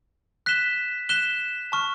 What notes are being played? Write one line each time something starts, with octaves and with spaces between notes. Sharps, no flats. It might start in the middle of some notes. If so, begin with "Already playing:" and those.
F#6 B6 E7 G7
F#6 B6 E7 G7
A5 C#6 F6